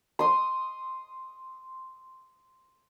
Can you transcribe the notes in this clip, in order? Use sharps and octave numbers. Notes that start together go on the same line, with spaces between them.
C6 D#6